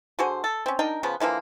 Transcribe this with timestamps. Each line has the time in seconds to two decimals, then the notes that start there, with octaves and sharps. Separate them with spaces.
0.19 D3 F#4 G#4 C5
0.44 A4
0.66 C4 C#4
0.79 D4 D#4 A#4 G5
1.03 C#3 F3 B3
1.20 D3 E3 F3 A#3